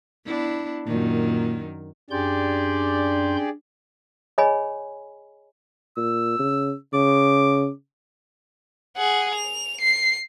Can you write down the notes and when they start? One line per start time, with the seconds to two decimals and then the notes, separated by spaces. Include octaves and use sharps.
0.25 B3 D4 E4
0.86 F#2 A#2 D#3
2.10 F#2 D4 G4 G#4 D5 C6 G6
4.38 G#4 C#5 D#5 G#5 B5
5.97 A#2 E6
6.39 C#3
6.94 C#3 D6
8.97 G#4 F#5
9.35 F7
9.81 C7